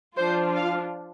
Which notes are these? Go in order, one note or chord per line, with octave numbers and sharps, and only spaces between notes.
F3 D4 F4 C5
F5